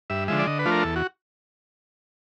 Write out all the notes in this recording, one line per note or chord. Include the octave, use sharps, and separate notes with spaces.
G2 E5
D3 F3 G#3 E5
D5
D3 D#5
B4
F3 A3 D4 F4
A#4
E2 A4
F#4